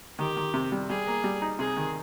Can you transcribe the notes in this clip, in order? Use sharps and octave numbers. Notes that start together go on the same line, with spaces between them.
D#3 G4
D#3
C3
G3
G3 G#4
A#3
G3
D#4
C3 G#4
D#3